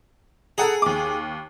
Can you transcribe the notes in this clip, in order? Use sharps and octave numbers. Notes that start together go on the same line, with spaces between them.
G#4 A4 F#5 A#5
D#2 D6